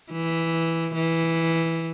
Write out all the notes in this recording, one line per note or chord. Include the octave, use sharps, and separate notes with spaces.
E3
E3